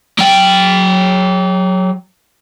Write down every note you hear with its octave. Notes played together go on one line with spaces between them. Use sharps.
F#3 G5